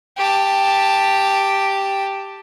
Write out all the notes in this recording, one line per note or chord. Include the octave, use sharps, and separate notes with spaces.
G4 A5